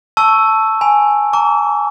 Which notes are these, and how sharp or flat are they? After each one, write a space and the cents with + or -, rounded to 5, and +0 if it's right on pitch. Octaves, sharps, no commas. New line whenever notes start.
A5 +0 C#6 +0 E6 +0
G#5 +0 B5 +0
A#5 -35 D6 -45